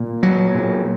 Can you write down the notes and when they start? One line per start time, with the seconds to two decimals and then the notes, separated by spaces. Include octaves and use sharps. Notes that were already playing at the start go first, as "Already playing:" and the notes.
Already playing: A#2
0.23 F#3
0.55 A#2